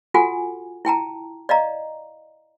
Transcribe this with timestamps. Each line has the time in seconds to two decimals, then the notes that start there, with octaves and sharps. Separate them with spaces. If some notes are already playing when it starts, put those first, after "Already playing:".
0.14 F4 F#4 A4 F#5 G#5
0.85 E4 G5 A5 A#5
1.49 D5 D#5 F5 A#5